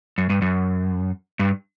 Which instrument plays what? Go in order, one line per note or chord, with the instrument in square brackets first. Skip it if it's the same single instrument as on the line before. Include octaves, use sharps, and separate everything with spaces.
[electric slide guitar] F#2
G2
F#2
G2